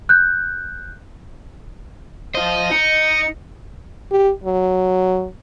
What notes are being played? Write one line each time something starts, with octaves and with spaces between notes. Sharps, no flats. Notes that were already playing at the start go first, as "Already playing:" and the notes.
F#6 G6
F4 C5 D#5
D#4 C#7
G4
F#3